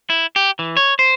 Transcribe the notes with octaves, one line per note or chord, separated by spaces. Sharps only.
E4
G4
E3
C#5
C5